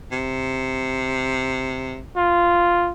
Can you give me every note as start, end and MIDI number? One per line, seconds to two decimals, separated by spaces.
0.11 1.99 48
2.16 2.92 65